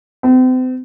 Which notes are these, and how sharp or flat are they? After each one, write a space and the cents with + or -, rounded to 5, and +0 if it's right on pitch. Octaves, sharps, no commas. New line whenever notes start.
C4 -40